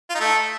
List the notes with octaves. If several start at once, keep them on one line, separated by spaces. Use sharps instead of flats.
F4
D#4
A3